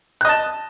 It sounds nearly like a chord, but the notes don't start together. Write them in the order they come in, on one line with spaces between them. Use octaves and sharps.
F#6 D#5 A5